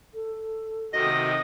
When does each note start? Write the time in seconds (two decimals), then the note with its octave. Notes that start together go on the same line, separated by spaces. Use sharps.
0.14 A4
0.93 C3 D#3 F#4 D#5 D#6